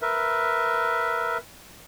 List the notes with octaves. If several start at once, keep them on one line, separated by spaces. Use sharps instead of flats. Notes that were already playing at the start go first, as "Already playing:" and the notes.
A#4 B4 E5